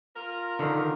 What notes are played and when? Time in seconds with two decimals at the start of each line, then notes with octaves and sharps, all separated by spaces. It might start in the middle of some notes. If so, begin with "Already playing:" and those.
0.16 F4 A#4
0.59 D3 D#3